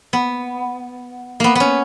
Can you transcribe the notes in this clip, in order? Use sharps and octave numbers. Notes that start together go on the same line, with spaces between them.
B3
A#3 B3
B3 C#4